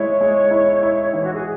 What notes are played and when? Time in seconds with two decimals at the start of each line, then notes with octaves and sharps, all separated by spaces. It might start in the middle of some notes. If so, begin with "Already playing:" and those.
Already playing: G#3 E4 C#5
0.21 G#3
0.51 E4
0.83 E4
1.13 E3
1.24 F#4
1.33 G#4